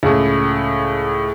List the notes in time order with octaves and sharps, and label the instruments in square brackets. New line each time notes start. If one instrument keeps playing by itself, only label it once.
[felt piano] C#2 A2